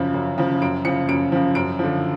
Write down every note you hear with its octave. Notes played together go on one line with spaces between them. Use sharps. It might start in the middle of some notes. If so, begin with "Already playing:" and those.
Already playing: F#2 C#3 F3
F#2
C#3 F3
F#2 D7
C#3 F3 C#7
F#2 D7
C#3 F3
F#2 D7
D3 F3